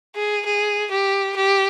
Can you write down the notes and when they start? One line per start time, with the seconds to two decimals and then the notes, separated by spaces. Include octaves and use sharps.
0.16 G#4
0.46 G#4
0.91 G4
1.37 G4